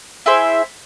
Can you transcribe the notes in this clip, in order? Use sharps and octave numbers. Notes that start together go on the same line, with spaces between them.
E4 G#4 C5 E5